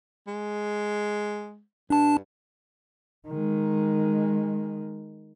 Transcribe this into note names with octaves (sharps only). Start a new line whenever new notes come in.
G#3
G2 D4 A5
D#3 G#3